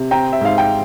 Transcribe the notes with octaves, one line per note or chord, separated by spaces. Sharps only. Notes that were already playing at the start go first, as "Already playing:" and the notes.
Already playing: C3
C4 G5 A#5
E5
G#2 F5
G5